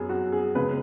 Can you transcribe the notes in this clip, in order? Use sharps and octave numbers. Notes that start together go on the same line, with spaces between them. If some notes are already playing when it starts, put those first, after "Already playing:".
Already playing: F#2 F#3 B3 G#4
F#4
G#4
C#2 C#3 G#3 B3 B4